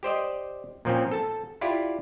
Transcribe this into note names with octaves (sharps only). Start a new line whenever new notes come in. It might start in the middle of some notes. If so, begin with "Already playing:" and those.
G4 C5 D5 D#5
A#2 F3 C4 C#4
A4 A5
E4 F4 G4 D5